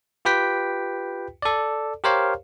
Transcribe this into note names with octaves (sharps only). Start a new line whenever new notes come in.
F4 G4 B4 G5 B6
A4 D5
G4 A#4 C5 C#5 F5